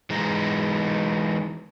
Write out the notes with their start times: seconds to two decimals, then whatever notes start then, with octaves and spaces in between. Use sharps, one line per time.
0.10 E3 G#3 D#4